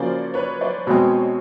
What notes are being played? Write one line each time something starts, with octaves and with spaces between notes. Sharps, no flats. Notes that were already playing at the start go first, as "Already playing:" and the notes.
Already playing: C#3 F3 A#3 C#4 F#4 C5 D5
B4 C#5
C5 D5
B2 G#3 C4 C#5 D#5